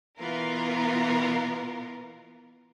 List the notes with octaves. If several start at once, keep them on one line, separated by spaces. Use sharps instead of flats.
B2 E3 B3 F4 A#4